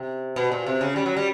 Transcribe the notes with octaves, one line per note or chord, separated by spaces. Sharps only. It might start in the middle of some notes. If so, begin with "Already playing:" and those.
Already playing: C3
B2
A#2
C3
C#3
G3
F#3
G3